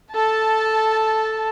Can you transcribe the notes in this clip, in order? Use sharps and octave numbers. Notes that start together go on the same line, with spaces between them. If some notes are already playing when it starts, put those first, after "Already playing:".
A4 A5